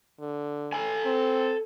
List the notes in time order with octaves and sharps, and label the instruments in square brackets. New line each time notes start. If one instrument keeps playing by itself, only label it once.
[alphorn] D3
[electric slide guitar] A4 G#5
[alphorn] C4